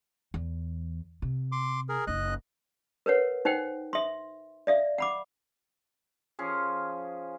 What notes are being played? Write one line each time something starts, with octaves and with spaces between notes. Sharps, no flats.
E2
C3
C6 D6
G#4 A#4
F#1 D#4 D#5 F#6
A#4 B4 C#5 F#5
D#4 C5 F#5 G5
E5 C6
D5 E5 F5
F#5 B5 D6
F3 C#4 G#4